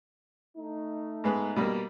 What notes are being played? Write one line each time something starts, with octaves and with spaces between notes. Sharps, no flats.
A3 D#4
G#2 G#3 B3
B2 G3 A#3